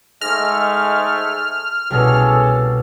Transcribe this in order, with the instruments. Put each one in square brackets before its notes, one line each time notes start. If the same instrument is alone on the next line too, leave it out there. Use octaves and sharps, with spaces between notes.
[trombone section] G#2 G#3 A3 [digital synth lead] F6 [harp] A#6
[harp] C2 B2 [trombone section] C#4 G#4 A4